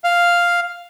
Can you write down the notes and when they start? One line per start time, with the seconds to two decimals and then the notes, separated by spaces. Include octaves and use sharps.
0.04 F5